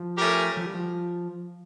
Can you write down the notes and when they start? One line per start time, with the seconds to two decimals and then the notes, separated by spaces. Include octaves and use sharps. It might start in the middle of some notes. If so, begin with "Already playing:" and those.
Already playing: F3
0.18 A3 C#4 G4 A#4
0.57 F3
0.66 G3
0.74 F3